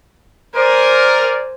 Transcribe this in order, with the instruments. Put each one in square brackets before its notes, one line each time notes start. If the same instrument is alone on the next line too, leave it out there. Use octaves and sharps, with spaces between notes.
[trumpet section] A#4 D5 [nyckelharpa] C5 G#5